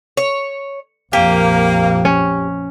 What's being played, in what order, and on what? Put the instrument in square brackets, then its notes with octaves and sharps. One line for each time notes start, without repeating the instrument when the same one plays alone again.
[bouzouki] C#5
[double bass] A#1 F2 [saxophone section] A#3 [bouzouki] G4
[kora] C#4